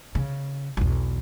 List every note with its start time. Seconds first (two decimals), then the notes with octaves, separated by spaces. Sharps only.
0.15 C#3
0.77 B1 E2